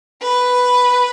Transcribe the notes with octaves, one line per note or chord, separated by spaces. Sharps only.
B4